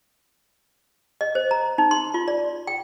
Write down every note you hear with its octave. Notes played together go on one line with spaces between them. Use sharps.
D#5
C5
A#5
D#4
C6
F4
D5
G5